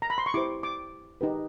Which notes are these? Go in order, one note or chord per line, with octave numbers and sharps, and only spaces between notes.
A#5
B5
C6
C#6
E4 G4 C5 D6
D6
D#4 G4 B4